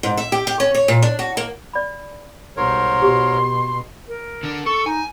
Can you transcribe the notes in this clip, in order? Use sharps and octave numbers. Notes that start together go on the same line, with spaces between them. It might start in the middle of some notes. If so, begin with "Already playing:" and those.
G#2
E5
G4
G4
C#4
C#5
A#2
D4
F#4
A#3
D5 B5
B1 G#2 G3 A#4 C#5 C6
B2 F#4 G4
A#4
D3 D4
A4 C#6
D#4 G#5